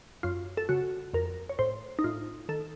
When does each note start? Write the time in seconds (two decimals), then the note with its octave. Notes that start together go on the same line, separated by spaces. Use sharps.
0.23 F#2 F4
0.57 A4
0.69 C#3 F#4
1.14 F2 A#4
1.49 C#5
1.59 A2 C5
1.99 D#4
2.04 A2 F4
2.49 D#3 A4